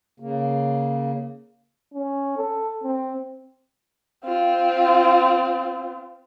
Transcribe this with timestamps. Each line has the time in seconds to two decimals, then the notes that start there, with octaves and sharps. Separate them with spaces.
0.20 C#3 A#3
1.94 C#4
2.37 A4
2.84 C4
4.25 C4 F4